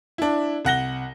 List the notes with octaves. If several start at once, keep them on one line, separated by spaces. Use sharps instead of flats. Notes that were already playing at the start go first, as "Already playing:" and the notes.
D4 E4
C2 F#5 A#6 G7